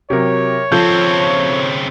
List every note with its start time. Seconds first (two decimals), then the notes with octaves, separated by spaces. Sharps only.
0.10 C3 F#3 G4 A#4 C#5
0.72 C#3 F3 C4 F4 A4 G6